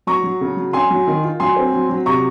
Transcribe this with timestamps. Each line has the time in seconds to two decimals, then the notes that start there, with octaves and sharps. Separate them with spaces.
0.07 F#3 A#5 C#6
0.24 F#3
0.41 C#3
0.57 F#3
0.73 C#4 G#5 C6
0.91 F#3
1.07 D#3
1.24 F4
1.40 F#3 G#5 C6
1.56 C4
1.73 F#3
1.89 F#3
2.06 C3 A#5 C#6